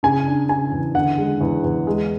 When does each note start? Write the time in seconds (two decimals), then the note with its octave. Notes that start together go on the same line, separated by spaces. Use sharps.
0.03 C#3 G#5
0.26 D4
0.49 C#3 G#5
0.72 E2
0.95 D3 F#5
1.18 G#3
1.41 E2
1.64 E2
1.87 G#3